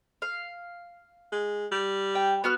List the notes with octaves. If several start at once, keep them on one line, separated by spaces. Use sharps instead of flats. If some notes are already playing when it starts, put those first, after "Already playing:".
F5
G#3
G3
G5
B3 F#4 F6